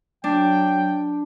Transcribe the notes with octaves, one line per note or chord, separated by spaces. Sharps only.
F#3 D4 G5